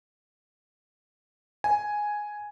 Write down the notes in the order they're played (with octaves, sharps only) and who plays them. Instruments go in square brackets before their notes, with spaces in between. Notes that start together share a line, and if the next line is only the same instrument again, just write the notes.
[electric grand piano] G#5